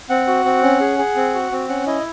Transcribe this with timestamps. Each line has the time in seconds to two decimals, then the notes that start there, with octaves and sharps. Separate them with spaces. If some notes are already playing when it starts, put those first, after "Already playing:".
0.10 C4 F#5
0.28 F#4
0.45 C4
0.62 C#4
0.80 G#4
0.98 G#4
1.16 C4
1.34 F#4
1.52 C4
1.69 C#4 F#5
1.86 E4 D#5